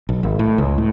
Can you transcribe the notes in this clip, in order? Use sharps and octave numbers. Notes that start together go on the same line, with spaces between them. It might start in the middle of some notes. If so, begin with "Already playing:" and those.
B1
G#1
A2
C#2
A2